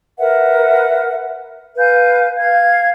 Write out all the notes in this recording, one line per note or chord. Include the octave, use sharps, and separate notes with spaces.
A#4 B4 E5 F#5
B4 F5 G#5 G6
F5 G#6